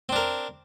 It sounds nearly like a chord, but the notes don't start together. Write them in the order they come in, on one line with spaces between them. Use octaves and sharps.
C4 D4 A#4